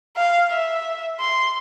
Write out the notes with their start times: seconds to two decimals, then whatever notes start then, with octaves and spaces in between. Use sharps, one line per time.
0.16 F5
0.50 E5
1.20 C6